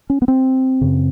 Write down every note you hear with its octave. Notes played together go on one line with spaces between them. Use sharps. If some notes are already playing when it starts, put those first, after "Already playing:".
C#4
B3
C4
F#2 C#3